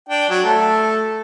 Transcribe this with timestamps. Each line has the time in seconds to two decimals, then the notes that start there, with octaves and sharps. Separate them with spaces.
0.09 D4 G5
0.29 F#3
0.45 A3 A4